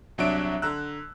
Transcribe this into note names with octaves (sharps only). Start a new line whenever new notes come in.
C2 F#3 D4 E5 D7
D3 A#5 E6 F#6